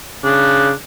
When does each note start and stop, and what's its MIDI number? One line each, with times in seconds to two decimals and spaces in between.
0.24 0.71 49
0.24 0.71 62